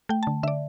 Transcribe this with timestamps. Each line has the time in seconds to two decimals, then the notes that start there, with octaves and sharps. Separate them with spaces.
0.09 A3 G5
0.23 A5
0.27 D3
0.43 D3 E5
0.48 D5